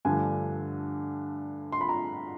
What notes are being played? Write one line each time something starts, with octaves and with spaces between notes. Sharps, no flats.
G2 D3 F3 A3 G#5
C6
B5
A#5